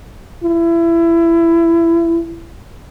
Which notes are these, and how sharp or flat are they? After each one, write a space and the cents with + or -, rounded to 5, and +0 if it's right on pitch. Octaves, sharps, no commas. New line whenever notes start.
E4 +25